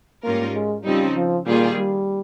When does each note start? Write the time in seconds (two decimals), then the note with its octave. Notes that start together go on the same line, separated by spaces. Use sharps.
0.23 G#2 G3 A#3 C#4 F4 A#4
0.54 G#3
0.84 C#3 F3 G3 C4 D#4
1.16 F3
1.47 A#2 D#3 G3 A#3 F4 G#4
1.77 G3